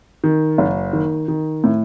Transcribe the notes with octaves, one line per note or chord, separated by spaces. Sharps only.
D#3
F#1
D#3
D#3
A2